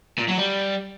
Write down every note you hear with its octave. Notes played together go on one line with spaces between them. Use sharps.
A#2
F#3
G3